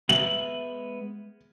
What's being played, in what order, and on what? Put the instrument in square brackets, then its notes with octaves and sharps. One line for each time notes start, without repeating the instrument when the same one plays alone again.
[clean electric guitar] G#3 B3 E5 [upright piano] F#7